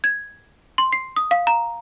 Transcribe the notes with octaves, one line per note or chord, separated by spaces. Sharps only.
G#6
C6
C7
D#6
F5
A#5